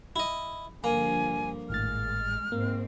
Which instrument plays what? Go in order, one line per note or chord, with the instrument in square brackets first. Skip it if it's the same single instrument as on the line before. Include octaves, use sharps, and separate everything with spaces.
[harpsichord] E4 D#5
[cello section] G2 D3 F3 [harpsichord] A#3 [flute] G#5
[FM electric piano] G#1 A2 A6 [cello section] G#3 [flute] F6
[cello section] G#2 C4 [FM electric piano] A#3